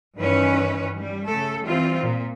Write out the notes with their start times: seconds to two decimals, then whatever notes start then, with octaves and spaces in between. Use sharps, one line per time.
0.17 G2 D#3 E3 C#4 B4
0.96 G3
1.27 C#3 A3 A4
1.63 E3 G3 C4 F4
2.03 A#2